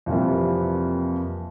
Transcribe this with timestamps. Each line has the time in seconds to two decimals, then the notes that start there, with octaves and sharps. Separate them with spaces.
0.06 F2 C3 E3 G3 A#3